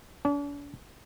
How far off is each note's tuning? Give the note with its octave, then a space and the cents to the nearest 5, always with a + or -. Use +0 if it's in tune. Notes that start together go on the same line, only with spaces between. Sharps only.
D4 -45